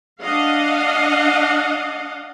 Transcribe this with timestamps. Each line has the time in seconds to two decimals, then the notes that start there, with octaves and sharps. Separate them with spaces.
0.22 D4 D#5 F5 F#5